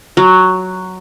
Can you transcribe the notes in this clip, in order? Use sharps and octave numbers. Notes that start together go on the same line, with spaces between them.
F#3